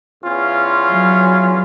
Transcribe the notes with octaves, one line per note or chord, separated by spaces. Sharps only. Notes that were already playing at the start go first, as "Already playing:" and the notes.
E2 C#4 F4
F#3